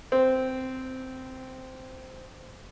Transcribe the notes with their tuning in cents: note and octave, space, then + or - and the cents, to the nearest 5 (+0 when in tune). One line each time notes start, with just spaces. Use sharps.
C4 -10